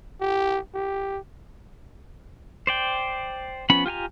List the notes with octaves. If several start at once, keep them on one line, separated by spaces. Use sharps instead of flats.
G4
G4
C5 D5 G5
F3 B3 C#4 B5
F4 G4 G#5 A#5